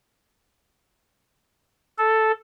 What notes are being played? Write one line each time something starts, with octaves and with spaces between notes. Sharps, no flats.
A4